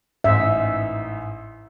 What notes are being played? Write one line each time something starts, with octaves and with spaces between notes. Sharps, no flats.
A1 G#2 D#4 E5